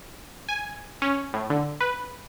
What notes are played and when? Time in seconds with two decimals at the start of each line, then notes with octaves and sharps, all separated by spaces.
0.48 G#5
1.02 C#4
1.34 A2
1.50 D3
1.80 B4